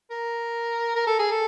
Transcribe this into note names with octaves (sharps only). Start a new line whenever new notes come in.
A#4
A#4
A4
G#4
A4